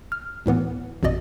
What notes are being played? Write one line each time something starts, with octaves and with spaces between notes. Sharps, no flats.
F6
D2 A2 E3 B3
A1 F2 B2 D5 D#5